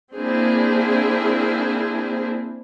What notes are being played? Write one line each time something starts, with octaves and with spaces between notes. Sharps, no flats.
A#3 C4 D4 E4 G#4